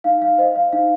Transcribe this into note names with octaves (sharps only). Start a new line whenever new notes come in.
D#4 F5
F5
C5 D#5
F5
D#4 F5